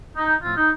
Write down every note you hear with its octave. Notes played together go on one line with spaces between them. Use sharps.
D#4
A2 F3 A3 C4 F4
D#4